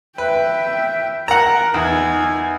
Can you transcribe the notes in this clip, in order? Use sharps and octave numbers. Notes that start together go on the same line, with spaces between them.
B4 E5 G5
A#4 F#5 A#5
E2 D#4 G#5